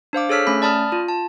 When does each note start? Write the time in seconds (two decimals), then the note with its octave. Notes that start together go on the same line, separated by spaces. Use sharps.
0.13 D4 C5 F5 D6
0.29 G#4 A4 C#5 E6 F6 B6
0.47 A3 C#4 B5
0.62 D5 A5 B5 D#6 F6
0.92 F4
1.08 A5